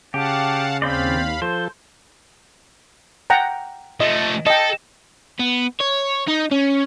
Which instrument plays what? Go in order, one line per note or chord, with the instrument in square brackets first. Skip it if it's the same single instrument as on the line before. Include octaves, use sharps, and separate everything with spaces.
[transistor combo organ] C#3 [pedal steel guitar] G4 [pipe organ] F5 F#5 A5
[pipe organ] D#2 F5 B5 [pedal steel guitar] C4 C5 D5
[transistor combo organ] F3 A4 [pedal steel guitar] C5
[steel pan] F#5 G5 A#5
[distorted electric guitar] F3 A3 [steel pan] D#5
[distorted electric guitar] A4 [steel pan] D#5 G5
[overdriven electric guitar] B3
C#5
D#4
C#4